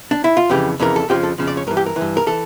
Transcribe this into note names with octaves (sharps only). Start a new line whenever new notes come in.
D4
E4
F4
F2 C#3 E3 G4
F2 C#3 E3 A#4
A4
F2 C#3 F3 G4
A4
F2 C#3 F3
D5
C#5
G2 E3 A#4
G4
A#4
E3
G2
A#4
E3 A4